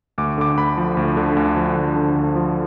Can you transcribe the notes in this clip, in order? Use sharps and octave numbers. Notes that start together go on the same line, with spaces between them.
D2 D6
D3 D6
D2 B5
F3
D2
D3
D2
F3
D2
D3
D2
F3